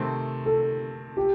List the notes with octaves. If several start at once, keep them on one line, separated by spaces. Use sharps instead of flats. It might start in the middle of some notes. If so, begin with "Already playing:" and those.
Already playing: C3 D#3 A3 C4
A4
G4